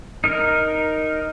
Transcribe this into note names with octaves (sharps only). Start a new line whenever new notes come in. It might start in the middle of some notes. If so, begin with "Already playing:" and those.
D#4 A#4